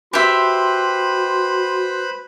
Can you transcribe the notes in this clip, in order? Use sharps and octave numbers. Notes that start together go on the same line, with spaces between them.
F#4 G4 B4 C5 E5 B5 C6